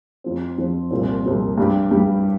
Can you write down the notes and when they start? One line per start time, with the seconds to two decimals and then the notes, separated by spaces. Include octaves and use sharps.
0.24 F2 F3 C4
0.58 F2 F3 C4
0.91 C2 A#2 F3 C4
1.25 C2 A#2 F3 C4
1.58 G2 G3 D4 G4
1.91 G2 G3 D4 G4